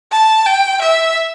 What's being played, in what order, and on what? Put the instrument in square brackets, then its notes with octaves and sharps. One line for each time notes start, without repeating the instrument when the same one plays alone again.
[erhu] A5
G5
E5